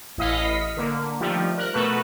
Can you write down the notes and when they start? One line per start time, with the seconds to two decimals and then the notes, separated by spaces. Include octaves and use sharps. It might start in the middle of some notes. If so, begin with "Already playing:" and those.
0.18 A1 E4 D#5 F5 B6 C#7
0.77 D3 A#3
1.20 D#3 F3 G3 A3
1.58 A#4 F#6
1.74 B2 A3 F#4 A4 B4